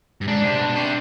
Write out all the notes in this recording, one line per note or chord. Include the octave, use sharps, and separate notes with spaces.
G2
G#2 D4
C3
B2
C3